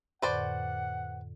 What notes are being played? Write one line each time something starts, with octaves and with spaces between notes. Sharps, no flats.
F2 A2 D3 B4 C5 D5 F#5